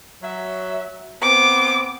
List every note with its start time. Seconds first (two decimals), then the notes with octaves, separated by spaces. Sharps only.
0.23 F#3 E5
1.22 B3 C4 D6